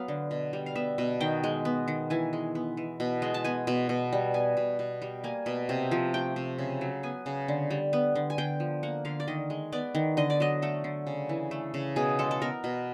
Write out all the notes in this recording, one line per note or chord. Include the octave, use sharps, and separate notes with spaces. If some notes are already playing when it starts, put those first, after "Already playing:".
Already playing: F#3 B3 F5
D3
B2
G3
F5
B3 E5
B2
D#3 G5
G#3
B3
D#3
E3 G#5
G#3
B3
E3
B2
G#3
A5
B3 G#5
B2
B2
G3
B3 G#5
B2
B2
G3
A#3 G#5
B2
C3
F3
A3 G5
C3
C#3
F#3
B3 G#5
C#3
D3
G3
B3
D3
G#5
D3 G5
F3
A#3 F#5
D3 F5
D5
D#3 D#5
G#3
B3 D5
D#3
D3 D#5
D5
F#3 D#5
A3 A4
D3
C#3
E3
A3
C#3
B2 G#4
G#3 A4
A4
B3 A#4
B2